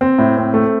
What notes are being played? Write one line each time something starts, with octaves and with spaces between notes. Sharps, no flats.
C4
A2
C4
A3